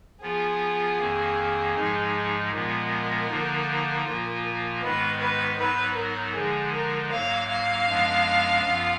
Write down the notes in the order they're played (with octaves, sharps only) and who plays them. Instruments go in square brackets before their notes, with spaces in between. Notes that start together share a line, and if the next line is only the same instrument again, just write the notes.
[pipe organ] F3 B3 F4 [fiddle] G#4
[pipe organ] F2 D#3 A#3
G#2 F3 G#3 D#4
[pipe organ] A#2 F3 G#3 B3 [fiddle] A#4
[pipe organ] D3 F3 A#3 D#4
A#2 F3 A#3 F4
[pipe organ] G#2 D#3 G#3 B3 [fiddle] B4
[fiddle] B4
[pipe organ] G#2 F#3 B3 D#4 [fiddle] B4
[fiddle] A#4
[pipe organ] D3 F3 G#3 D#4 [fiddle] G#4
[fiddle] A#4
[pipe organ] G#2 F#3 A#3 [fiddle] F5
[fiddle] F5
[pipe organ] F#2 F3 G#3 B3 D4
F#2 F3 B3 F4